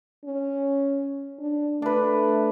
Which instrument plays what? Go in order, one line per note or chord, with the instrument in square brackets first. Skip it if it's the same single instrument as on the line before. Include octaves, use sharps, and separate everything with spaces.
[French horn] C#4
D4
[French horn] A3 [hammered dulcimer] D4 B4